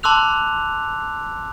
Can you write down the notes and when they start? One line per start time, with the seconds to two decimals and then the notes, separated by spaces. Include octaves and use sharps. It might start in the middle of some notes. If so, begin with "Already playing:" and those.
0.03 A5 C6 D6 E6 F#6 F7